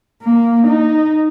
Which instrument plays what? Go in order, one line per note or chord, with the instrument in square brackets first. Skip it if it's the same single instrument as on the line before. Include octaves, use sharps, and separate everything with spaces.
[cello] A#3
D#4